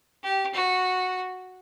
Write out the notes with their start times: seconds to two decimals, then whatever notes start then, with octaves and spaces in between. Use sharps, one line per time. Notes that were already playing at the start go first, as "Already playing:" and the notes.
0.24 G4
0.54 F#4